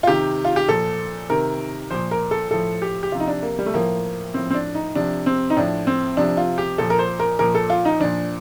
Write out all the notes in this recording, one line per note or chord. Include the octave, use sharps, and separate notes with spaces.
F4
C3 D#3 G4
F4
G4
A#2 F3 A4
C3 D#3 A#4
A#2 F3 C5
A#4
A4
A2 F3 A4
G4
G4
C3 F3 F4
D#4
D4
A#3
G3
A3
A2 F3 A#3
A2 F3 C4
C4
D4
D#4
C3 F3 D4
C4
D#4
A2 F3 D4
C4
C3 F3 D4
F4
G4
A#2 F3 A4
A#4
C5
A#4
A#2 F3 A#4
A4
F4
D#4
A#2 F3 D4